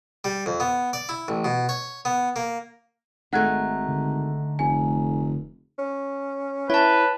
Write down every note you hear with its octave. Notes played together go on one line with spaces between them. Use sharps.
G3
F2
B3
D5
E4
A1
B2
C#5
B3
A#3
G#1 A3 D#4 F#5 F#6 G#6
D3
F1 G#5
C#4
E4 B4 C#5 A5